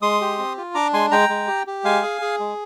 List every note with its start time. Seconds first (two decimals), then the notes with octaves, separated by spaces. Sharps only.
0.02 G#3 C6 D#6
0.21 G4
0.38 C4
0.57 F4
0.75 D4 A#5 D6
0.93 G#3 G#5 C6
1.11 G#3 G5 A#5
1.29 G#3
1.47 G4
1.67 G4
1.84 G#3 F5 G#5
2.02 G#4
2.21 G#4
2.40 G#3